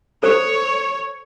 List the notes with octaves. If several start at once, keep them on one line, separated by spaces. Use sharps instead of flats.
A4 C5 C#5